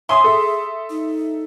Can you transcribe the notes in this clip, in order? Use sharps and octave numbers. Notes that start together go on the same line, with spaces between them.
C#5 E5 G#5 C6 D#6
G#4 A4 E5
D#4